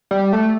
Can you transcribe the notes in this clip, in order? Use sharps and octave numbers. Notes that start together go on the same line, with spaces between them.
G3
A3